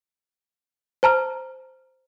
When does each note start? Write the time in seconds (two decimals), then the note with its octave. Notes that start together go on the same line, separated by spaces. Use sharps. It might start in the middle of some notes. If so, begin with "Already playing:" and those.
1.03 C5 A5 A#5 F6